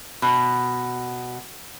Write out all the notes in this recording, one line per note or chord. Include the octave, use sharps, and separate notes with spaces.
B2